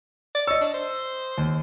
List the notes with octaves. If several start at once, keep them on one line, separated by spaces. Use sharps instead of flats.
D5
C#5 D#5 E6
D4
C5
D#2